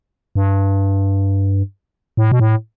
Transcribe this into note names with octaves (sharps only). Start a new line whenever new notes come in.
G2
A2
B2
A2